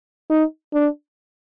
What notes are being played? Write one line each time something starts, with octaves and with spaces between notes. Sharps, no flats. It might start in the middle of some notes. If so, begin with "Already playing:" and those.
D#4
D4